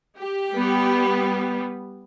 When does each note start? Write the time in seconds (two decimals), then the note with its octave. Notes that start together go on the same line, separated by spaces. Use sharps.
0.17 G4
0.52 G3 B3